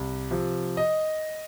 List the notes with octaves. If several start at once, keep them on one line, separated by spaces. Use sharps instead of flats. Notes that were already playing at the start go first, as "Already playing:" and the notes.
Already playing: C2
C3 F3
D#5